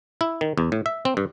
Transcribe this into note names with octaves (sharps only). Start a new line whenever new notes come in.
E4
D#3
E2
A2
E5
C4
G2